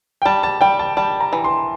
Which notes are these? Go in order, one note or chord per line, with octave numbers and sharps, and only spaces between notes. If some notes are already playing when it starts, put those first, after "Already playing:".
G5
G3 A5
A5
G3 G5
A5
G3 A5
A#5
E3
C6